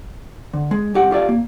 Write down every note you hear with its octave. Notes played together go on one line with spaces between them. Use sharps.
D3
G#3
C2 G4 F#5
F4 G4 D5 F5
A#3